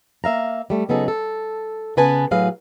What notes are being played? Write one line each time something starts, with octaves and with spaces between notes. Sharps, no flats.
A#3 E5 F5 A#5
G3 A3
C#3 F#3 B3 D#4 G#4 A4
A4
C#3 B3 B4 G#5 A5
A2 F#3 F#4 G#4 B4 F5